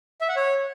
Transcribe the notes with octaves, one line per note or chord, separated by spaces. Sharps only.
E5
F#5
C#5